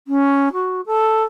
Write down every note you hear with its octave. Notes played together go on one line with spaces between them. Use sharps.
C#4
F#4
A4